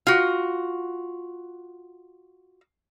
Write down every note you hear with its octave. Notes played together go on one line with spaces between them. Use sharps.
F4 F#4